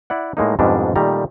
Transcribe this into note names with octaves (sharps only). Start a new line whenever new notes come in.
E4 D5 F#5
A2 G#3 A#3 D#4
F2 G#2 B2 G3 G#3 D4
A#2 D#3 G3 A3 A#5